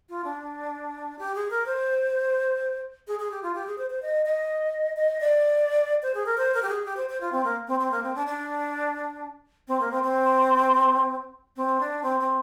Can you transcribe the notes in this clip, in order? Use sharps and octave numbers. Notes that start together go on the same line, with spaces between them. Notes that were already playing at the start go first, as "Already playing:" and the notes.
F4
D4
G4
G#4
A#4
C5
G#4
G#4
G4
F4
G4
G#4
C5
C5
D#5
D#5
D#5
D5
C5
G#4
A#4
C5
A#4
G4
G#4
G4
C5
C5
F4
C4
A#3
C4
C4
A#3
C4
D4
D4
C4
A#3
C4
C4
C4
D4
C4
C4